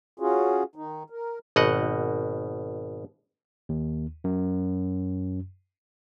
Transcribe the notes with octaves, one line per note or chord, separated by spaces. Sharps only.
C#4 F4 F#4 G#4
D#3 D#4
A#4
G#1 B2 D#5 F#5
D#2
F#2